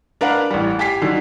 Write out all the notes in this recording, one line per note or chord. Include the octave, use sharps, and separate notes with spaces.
D4 A#4 B4 F5 F#5
A1 G3
G4 G#5 B6 C7
D3 D#3 F#3